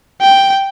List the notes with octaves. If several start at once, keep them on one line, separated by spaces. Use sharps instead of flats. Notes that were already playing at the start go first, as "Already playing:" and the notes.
G5